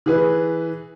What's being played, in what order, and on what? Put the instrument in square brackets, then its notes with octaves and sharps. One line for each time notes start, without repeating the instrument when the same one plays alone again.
[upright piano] E3 G#4 B4